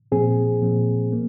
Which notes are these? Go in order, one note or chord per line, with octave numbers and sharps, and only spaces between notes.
A#2 F3 C4 G#4
A#2 F3 C4
A#3